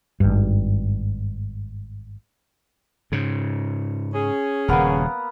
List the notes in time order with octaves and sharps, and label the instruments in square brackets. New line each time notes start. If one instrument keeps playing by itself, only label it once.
[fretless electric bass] G#1 G2
[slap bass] G#2 C#3
[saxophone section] C#4 G#4
[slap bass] D#1 C#3 [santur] A#3 B3 A#4